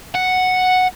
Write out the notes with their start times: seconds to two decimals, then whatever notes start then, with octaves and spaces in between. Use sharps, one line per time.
0.14 F#5